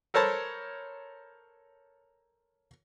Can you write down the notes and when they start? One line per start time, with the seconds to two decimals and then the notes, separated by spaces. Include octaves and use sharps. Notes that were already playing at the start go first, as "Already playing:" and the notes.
0.14 A4 A#4 C5 C#5 A5 B5